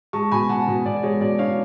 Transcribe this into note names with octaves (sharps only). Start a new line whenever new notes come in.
G#3 A5 C#6
B2 G#5 B5
B2 F#5 A5
B2
B2 D5
G#3 C#5
B2 D5
D4 C#5 F5